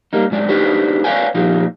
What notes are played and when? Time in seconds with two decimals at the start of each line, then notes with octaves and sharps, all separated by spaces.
0.13 G3 A#3 D#4
0.31 G#2 F#3 D5
0.49 D4 D#4 F#4 G4 B4 C5
1.04 B4 C#5 D5 F5 G5 G#5
1.34 A#2 F3 D#4 G4